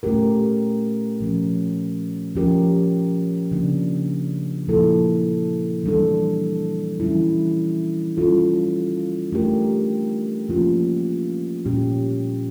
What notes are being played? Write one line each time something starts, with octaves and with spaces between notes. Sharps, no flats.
A#2 A3 C#4 G4 A#4
A#2 F3 C#4
F3 C#4 G4 A#4
C#3 F3 A#3 D4
A#2 F3 A#3 E4 A4
E3 G3 D4 A4
E3 G3 C#4 E4
G3 C#4 F4 A4
A3 D4 G4 A#4
F3 A#3 C#4 F4
A#2 G3 C#4 G4